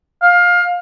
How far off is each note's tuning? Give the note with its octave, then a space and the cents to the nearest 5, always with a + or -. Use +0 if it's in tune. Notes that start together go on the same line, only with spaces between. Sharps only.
F5 +20